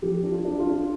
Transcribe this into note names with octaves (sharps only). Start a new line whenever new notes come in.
F3 G4
D4
F4
D4
F4
D4